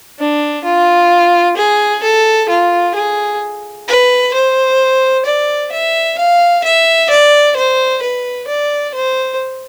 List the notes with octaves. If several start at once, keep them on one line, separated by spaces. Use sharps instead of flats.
D4
F4
G#4
A4
F4
G#4
B4
C5
D5
E5
F5
E5
D5
C5
B4
D5
C5